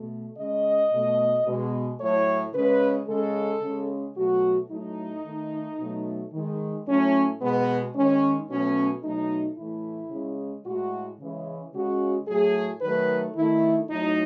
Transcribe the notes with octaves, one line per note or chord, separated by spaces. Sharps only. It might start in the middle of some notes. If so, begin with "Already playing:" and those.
Already playing: B2 A3
C#3 G#3 D#5
B2 A3
B2 G#3
A2 F#3 A3 C#5
C#3 G#3 B4
C#3 G#3 A4
C#3 G#3
B2 F#3 A3 F#4
A2 F#3 A3 D#4
D#3 A3
B2 F#3 A3
D#3 G#3
A2 F#3 A3 C#4
B2 G#3 B3
D#3 G#3 C#4
B2 F#3 A3 C#4
B2 F#3 A3 D#4
A2 E3 A3 E4
C#3 G#3
A2 G#3 F#4
C#3 E3 G#3
C#3 G#3 F#4
A2 F#3 A3 G#4
D#3 F#3 A3 B4
D#3 A3 E4
A2 F#3 A3 D#4